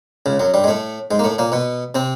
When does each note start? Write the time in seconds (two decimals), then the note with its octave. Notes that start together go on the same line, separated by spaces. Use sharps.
0.26 C#2 C#3
0.39 F#2 F#3
0.54 G2 G3
0.64 G#3
0.67 A2 A3
1.11 G#2 G#3
1.19 A#3
1.24 A2 A3
1.38 A#2 A#3
1.52 B2 B3
1.95 C3 C4